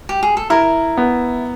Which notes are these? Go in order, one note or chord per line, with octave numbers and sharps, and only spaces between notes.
G4
G#4
A4
E4 A#4
B3